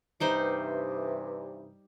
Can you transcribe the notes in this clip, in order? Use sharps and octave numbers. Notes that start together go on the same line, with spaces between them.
G2 C3 E3 G3 D#4 C5